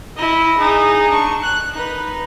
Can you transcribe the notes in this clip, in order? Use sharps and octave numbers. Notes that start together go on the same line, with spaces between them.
E4 D#5
D#4 G#4
D4 C#6
F#6
D#4 B4